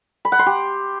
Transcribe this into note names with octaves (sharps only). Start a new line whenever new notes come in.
B5
F#5
C6
G4